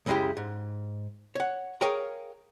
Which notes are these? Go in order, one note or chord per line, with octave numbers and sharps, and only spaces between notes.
C#2 F#2 C#3 G#3 E4 G4
G#2
C#5 F#5
G#4 A#4 C#5 F5 G5 A#5